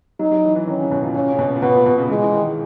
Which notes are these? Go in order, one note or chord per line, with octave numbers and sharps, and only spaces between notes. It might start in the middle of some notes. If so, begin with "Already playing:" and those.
F#3 D#4
F#3
E3
E3
D#3 C#4
C#3
B2
A#2
A#2 C#4
C#3
B2
A#2
B2 B3
A#2
B2
C#3
E3 G#3
E3
D#3